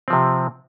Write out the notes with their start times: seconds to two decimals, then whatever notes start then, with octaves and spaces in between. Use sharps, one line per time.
0.08 C4
0.10 F3
0.13 C3